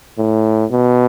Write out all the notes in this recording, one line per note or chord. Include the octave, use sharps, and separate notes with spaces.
A2
B2